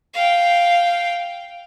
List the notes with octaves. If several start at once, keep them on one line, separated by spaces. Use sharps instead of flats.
F5 G5